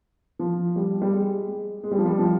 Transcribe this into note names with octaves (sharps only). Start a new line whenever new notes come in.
F3
G3
G3
G#3
G#3
G#3
G3
F3
G3
F3